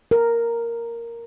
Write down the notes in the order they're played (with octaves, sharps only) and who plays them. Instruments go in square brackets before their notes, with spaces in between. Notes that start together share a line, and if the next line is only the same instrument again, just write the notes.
[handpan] A#4